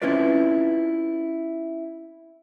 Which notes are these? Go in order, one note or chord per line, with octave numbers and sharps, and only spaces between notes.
C4 C#4 E4 F4 B4 D5